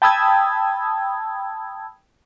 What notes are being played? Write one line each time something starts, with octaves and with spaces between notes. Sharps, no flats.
G5 A5 B5 D#6 E6 G#6